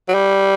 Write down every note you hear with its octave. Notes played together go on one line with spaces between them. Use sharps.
F#3
G3